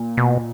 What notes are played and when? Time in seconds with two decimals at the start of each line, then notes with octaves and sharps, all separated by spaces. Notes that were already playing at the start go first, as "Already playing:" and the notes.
Already playing: A#2
0.17 B2